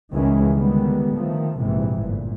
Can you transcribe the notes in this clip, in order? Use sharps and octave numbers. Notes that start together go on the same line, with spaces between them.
C#2 D#3 E3 G#3 C#4
D3 D#3 G3 G#3 B3
D#3 F3 A3
A#1 G#2 C3 E3
G1 A#2